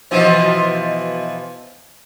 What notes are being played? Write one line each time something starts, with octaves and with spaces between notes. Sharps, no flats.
B2 E3 F3